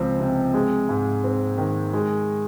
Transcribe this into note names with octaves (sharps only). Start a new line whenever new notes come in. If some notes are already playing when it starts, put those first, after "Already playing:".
Already playing: C#2 F3 C4
C3
G#3
G#2
C4
D#3
G#3